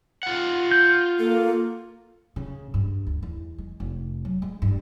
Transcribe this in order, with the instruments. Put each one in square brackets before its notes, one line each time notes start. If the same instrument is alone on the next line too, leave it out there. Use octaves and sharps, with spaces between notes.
[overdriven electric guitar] F4 F#5
[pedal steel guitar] G6
[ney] A#3 [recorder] A4
[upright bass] C#3
G2
D2
E2
G#3
F1
F#3
G#3
G2